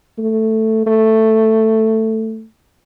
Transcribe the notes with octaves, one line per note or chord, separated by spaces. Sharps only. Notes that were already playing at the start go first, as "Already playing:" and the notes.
A3
A3